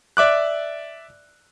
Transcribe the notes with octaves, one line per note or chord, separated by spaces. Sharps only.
D5 E5 D6 F#6